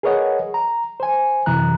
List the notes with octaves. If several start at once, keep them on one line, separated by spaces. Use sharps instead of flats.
G#4 A#4 B4 C#5 D#5 F#5
A#5
C5 G#5
F#2 C3 E3 A#5 F#6